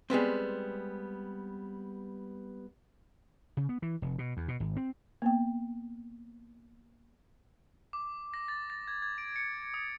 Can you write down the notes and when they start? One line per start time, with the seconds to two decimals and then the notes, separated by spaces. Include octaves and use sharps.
0.10 G3 G#3 B3 C4
3.57 C#3
3.69 B3
3.82 E3
4.02 F1
4.19 B2
4.37 E2
4.48 B2
4.60 G#1
4.77 C4
5.22 A#3 B3 G5
7.93 D6
8.34 A#6
8.48 A6
8.70 A6
8.88 G#6
9.02 G#6
9.18 D7
9.36 C#7
9.74 D#6